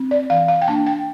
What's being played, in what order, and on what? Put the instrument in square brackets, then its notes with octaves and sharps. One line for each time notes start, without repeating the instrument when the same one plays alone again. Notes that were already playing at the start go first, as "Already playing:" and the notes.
Already playing: [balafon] C4
D5
E3 F5
F5
G5
A#3 D4 A5
G5